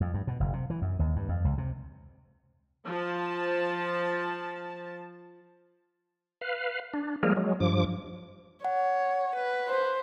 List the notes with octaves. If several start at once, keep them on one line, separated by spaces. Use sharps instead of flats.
F2
G2
B2
F#1
C3
E3
F#2
D#2
G2
F2
C#2
C3
F3 A5
B4 F5
D4
F3 G3 G#3 A#3 G#4 A#4
F#3 G#3
G2 F3 D6
C#5 F#5
B4
C5